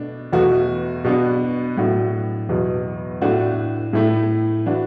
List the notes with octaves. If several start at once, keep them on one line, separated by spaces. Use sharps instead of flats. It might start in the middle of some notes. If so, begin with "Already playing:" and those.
Already playing: B2 A3 D4
E2 B2 A3 F#4
B2 B3 D4 F#4
A2 F#3 D4 F#4
E2 B2 F#3
A2 A3 D4 F#4
A2 A3 E4
E3 D4 F#4